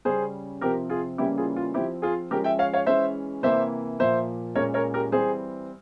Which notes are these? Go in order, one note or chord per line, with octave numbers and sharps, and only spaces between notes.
C#3 G3 C#4 G#4 C5
C3 F3 C4 G4 A#4
F4 G#4
C#3 E3 G3 A#3 C#4 E4 G4
F4 G#4
F4
F3 C4 E4 G4
F4 G#4
F3 G#3 C#4 G4 A#4
E5 G5
C#5 F5
C#5 F5
E3 G#3 C#4 C5 E5
C3 E3 A#3 C5 E5
A#2 F3 A#3 C5 E5
A#2 G#3 C#4 A#4 C#5
A#4 C#5
G4 A#4
E3 G3 C4 G#4 C5